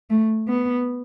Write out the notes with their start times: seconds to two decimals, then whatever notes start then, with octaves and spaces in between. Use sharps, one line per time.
0.10 A3
0.49 B3